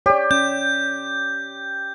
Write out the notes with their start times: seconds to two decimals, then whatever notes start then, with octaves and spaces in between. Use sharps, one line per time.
0.06 G4 C#5 D5
0.31 C#4 G6